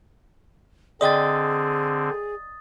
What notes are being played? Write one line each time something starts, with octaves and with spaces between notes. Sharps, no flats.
D3 C4 G#4 D5 D#5 G5 D#6 A6